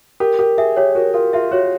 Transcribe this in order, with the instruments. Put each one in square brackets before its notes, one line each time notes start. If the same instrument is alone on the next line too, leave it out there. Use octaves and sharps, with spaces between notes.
[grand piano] G4 [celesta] A#4
[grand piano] G4 [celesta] A#4
[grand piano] G#4 [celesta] E5
[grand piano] G4 [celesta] C#5
[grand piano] F#4 [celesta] A#4
[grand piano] F4 [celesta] A#4
[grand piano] F4 [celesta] E5
[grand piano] F#4 [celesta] C#5